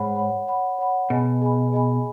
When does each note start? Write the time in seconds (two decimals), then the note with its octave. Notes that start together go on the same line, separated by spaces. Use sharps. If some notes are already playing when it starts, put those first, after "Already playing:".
Already playing: G#2 C#5 F#5 B5
0.16 C#5 F#5 B5
0.48 C#5 F#5 B5
0.78 C#5 F#5 B5
1.10 B2 G#4 D#5 G#5 B5
1.42 G#4 D#5 G#5 B5
1.72 G#4 D#5 G#5 B5